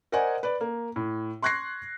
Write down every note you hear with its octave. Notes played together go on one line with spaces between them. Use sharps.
A#4 C5 D5 D#5 F#5 G#5
B4 D5
A#3
A2
C6 C#6 F#6 G#6 A#6 C7